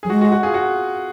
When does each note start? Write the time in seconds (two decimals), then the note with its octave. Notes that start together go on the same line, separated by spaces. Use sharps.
0.03 F#3 G#4
0.10 G#3 F#4
0.21 F#4
0.32 F#4
0.43 F4 G#4
0.54 F#4